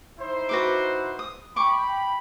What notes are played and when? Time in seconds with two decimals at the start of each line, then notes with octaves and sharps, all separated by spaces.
0.19 D#4 E4 C5
0.49 F#4 B4 D6
1.19 D#6
1.56 G5 B5 C#6 D6